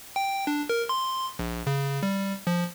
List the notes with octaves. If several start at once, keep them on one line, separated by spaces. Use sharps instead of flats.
G5
D4
A#4
C6
A#1
C#3
G3
F3